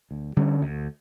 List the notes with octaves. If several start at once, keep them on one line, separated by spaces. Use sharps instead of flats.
D2
D3 G3 C#4
D2